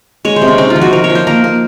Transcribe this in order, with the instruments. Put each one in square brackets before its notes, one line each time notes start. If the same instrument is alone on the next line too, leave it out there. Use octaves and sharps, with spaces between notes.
[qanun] G#3 C#5
C5
C3
C#4
C4 D#4
F4
F3
F#4
F3 A#4
C#5
F3
C5
A#3 A#4
A#3